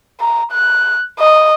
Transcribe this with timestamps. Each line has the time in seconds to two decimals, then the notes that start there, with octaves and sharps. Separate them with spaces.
0.20 A#5
0.51 F#6
1.19 D#5